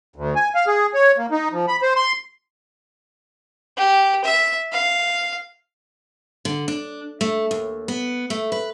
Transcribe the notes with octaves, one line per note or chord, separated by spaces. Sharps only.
D2
G#5
F5
G#4
C#5
A#3
D#4
F3
B5
C5
C6
G4
E5
F5
D3
D4
A3
D#2
B3
A3
B4